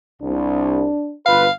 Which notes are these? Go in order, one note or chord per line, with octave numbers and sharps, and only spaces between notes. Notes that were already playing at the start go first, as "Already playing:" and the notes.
C2 D4
G1 F4 B4 F5